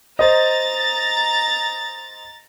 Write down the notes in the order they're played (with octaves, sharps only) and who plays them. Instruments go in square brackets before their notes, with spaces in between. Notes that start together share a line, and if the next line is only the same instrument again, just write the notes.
[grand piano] C5 D#5 [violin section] A#5 A6